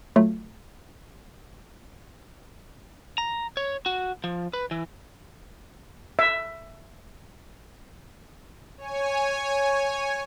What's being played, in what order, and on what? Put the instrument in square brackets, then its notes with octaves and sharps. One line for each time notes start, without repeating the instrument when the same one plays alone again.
[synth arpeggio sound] F#3 A3 F4
[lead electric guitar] A#5
C#5
F#4
F3
B4
E3
[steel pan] E5
[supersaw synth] C#5 G#5